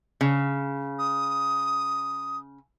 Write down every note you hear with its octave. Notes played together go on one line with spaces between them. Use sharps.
C#3
D#6